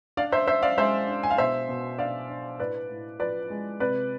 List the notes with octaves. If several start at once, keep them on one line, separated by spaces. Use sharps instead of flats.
D4 D5 F5
C5 E5
D4 C5 E5
D5 F5
G#3 C5 E5
D4
G#5
F5
B2 C5 E5
B2
D4 D5 F5
D4
A2 B4 D5
A2
F3 B4 D5
G#3
C3 B4 D5